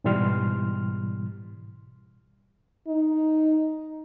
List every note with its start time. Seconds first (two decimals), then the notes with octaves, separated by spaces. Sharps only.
0.04 G#2 B2 E3 G3 C6 F6
2.88 D#4